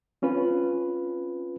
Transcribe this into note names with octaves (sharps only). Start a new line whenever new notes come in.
C4 C#4 F4 B4